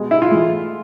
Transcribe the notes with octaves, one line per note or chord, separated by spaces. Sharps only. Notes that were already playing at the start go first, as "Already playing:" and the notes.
Already playing: B2 G#3
E4
F4
A2 E3 G#3